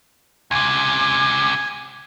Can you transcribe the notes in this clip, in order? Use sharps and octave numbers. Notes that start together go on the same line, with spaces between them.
C#2 C3 G#5